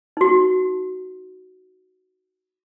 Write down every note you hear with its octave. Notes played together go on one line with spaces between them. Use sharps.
D#4 F#4